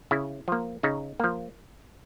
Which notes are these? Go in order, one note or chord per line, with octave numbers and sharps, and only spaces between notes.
C#3 E4
F3 A#3
C#3 D#4
F3 A#3